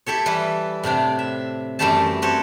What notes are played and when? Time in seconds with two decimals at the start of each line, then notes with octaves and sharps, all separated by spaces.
0.06 E4 G4 A4 C#5
0.26 E3 G3 B4
0.83 A2 C3 D4 D5
1.19 E5
1.79 F#2 E3 G3 A3 G4 A5
2.22 C4 F#4 G4 A4 C#5